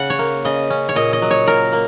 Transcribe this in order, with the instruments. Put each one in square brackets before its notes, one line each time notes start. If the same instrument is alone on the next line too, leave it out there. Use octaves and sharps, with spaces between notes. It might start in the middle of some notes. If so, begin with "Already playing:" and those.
Already playing: [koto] C#3 F#5
C#5
A#3
C#3 D#5
C#4
C#5
A#2 D#5
D#5
F#3
C#5
A#2 A#4
A#3